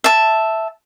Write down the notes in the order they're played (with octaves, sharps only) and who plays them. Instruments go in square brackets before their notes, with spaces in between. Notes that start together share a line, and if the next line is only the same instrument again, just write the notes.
[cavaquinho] E5 A5